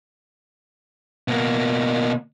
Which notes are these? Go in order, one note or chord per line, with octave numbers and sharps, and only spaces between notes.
B2 A#3